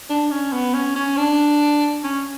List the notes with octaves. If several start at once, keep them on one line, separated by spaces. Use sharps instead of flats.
D4
C#4
B3
C#4
C#4
D4
C#4